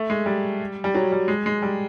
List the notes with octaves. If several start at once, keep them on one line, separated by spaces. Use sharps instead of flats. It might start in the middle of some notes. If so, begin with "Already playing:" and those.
Already playing: A3
G#3
G3
G3
F#3
G3
G#3
G#3
G3